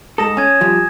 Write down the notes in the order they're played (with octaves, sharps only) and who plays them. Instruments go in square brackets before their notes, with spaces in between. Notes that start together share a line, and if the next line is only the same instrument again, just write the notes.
[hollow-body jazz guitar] G#2 A4 [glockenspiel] D#6 A#6 E7
[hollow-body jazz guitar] C#4 [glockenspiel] G#5 G#6
[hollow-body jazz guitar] F3 G3